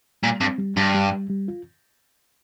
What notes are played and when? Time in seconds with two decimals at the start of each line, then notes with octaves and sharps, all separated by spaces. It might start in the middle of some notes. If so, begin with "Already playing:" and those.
0.23 A#2 G3
0.41 G2 C4
0.58 G3
0.77 G2 G3
0.95 G3
1.12 G3
1.30 G3
1.48 F4